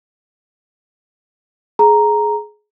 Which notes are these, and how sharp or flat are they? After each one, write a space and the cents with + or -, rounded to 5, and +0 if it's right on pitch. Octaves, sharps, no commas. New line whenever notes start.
G#4 +20 A#5 +0